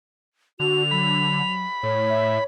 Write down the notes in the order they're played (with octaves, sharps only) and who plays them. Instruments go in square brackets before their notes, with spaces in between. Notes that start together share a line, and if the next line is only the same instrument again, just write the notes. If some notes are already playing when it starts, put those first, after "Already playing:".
[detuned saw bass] D3 [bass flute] F#4 [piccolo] F7
[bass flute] F#3 [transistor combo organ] B5
[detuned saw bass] A2 [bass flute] C#5
[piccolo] E5